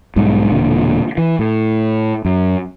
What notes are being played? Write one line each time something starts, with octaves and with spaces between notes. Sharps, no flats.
B1 G#2 G3
E1 A#2 D3
E3
A2
F#2